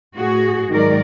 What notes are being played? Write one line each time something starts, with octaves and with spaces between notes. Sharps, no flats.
A2 F#4 G#4
G#2 D#3 F#3 G#3 A#4 D5